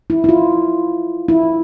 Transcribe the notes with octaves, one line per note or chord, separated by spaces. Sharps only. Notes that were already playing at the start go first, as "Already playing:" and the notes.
E4
E4
F4
E4